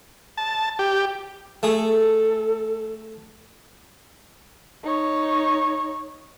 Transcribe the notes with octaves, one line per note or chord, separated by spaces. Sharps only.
A5
G4
A3 G#4 A4
D#4 C#5